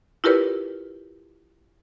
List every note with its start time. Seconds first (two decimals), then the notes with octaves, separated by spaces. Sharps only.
0.24 E4 F4 G4 A#4 B4 C#5